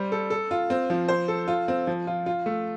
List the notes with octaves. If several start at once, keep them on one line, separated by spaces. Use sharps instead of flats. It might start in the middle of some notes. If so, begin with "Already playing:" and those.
Already playing: G3 C5
A4
A4
F4
C4
F3
C5
A4
F4
C4
F3
F4
F4
A3